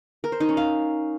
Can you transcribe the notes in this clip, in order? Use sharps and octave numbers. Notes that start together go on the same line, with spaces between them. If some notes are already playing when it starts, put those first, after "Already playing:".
A#4
C5
D#4
C#4
F5